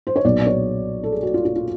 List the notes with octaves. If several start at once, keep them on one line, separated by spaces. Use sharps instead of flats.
C5
C#5
B1 A#2 F#3 B3 D5
D5
C#5
A4
G#4
F#4
F4
F4
F4